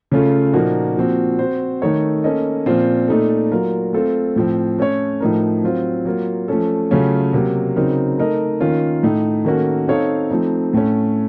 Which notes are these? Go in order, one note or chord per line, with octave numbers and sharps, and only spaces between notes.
C#3 A3 C#4 F4 A4
A#2 F3 A#3 D#4 F#4
A#2 F3 C4 F#4
C4 F#4 C5
D#3 A3 D#4 A4 C#5
A#3 C#4 A4 D#5
A#2 F3 C4 F4 C5
A#2 A3 D#4 A4
F#3 A#3 F4 A#4
A3 C4 F4 A4
A2 F3 C4
A3 C#4 A4 C#5
A2 F3 A3 D#4 A#4
F#3 C4 F4 C5
F#3 A#3 F4
F3 A3 C#4 A4
C#3 F#3 A3 C#4 F4
C3 F#3 A#3
C#3 F#3 C4 D#4 A#4
A3 D#4 A#4 D#5
D#3 A#3 C#4 F4
A2 A3 D#4
D#3 A#3 C#4 F#4 A4
C4 D#4 A4 C#5 F5
F3 A3 C4 D#4
A2 A3 C#4